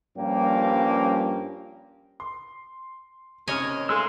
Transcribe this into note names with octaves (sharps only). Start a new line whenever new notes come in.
G2 F3 G3 A#3 C#4 G4
C6
D#2 C3 C#4 C#5 D#5 G#5 F6
G#3 A3 G#4 A#4 F5 C6 E6